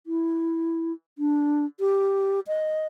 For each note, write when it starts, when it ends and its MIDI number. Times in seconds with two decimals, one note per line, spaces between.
0.07 0.92 64
1.18 1.65 62
1.80 2.40 67
2.47 2.87 75